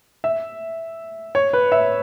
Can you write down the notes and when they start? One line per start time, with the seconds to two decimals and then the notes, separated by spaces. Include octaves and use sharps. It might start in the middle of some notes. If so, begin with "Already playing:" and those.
0.24 E5
1.35 C#5
1.53 B4
1.72 E5